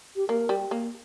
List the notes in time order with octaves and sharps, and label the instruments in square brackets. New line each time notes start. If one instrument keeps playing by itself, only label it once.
[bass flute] G4
[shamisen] A#3 [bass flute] A#4
[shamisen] G3
A#3